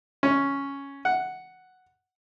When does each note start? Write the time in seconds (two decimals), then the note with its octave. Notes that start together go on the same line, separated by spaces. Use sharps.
0.23 C#4
1.05 F#5